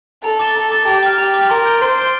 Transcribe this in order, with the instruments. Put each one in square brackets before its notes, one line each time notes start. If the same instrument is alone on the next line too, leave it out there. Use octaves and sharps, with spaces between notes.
[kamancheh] A4 [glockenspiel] A#5
[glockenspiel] D6 A6 E7 G7
A#5
D6 A6 E7 G7
[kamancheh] G4 [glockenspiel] A#5
[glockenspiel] D6 F6
[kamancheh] G4 [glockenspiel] A#5
[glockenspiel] D6
F6
[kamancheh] A#4 [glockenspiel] C6
[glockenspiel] G6 D7 G7
[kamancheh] C5 [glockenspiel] C6
[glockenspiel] G6 D7 G7